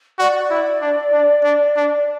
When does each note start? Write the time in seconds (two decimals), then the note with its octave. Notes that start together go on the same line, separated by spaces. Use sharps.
0.19 F#4 D5
0.51 E4
0.82 D4
1.13 D4
1.44 D4
1.76 D4